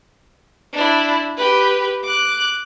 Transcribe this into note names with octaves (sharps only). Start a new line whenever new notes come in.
D4 E4
G4 B4
D6 F#6